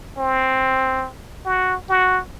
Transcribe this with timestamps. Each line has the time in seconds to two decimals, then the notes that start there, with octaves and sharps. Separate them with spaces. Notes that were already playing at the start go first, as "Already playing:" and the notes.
0.18 C4
1.46 F#4
1.89 F#4